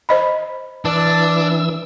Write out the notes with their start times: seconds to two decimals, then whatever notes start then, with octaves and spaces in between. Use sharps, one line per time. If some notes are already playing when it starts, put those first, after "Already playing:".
0.09 C5 D#5 B5
0.85 E3 D4 E6